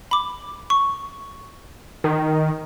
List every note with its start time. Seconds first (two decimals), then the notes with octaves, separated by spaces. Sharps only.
0.11 B5 D6
0.70 C#6
2.04 D#3